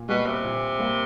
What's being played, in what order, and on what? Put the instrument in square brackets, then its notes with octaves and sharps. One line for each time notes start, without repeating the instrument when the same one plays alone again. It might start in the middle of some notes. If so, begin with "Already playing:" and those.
Already playing: [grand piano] A#2
[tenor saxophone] B2 [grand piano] G3 A#3
[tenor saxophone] C3
[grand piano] A#2
G3 A#3